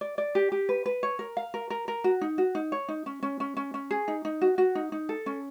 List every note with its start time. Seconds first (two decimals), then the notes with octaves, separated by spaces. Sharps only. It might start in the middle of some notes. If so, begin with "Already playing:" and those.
0.01 D5
0.18 D5
0.35 G4
0.52 G4
0.69 B4
0.86 B4
1.03 C#5
1.19 A#4
1.37 F5
1.54 A#4
1.70 A#4
1.88 A#4
2.04 F#4
2.21 D#4
2.38 F#4
2.55 D#4
2.72 C#5
2.89 D#4
3.06 C#4
3.23 C#4
3.40 C#4
3.57 C#4
3.74 C#4
3.91 G#4
4.08 D#4
4.25 D#4
4.41 F#4
4.58 F#4
4.75 D#4
4.92 D#4
5.09 A4
5.26 C#4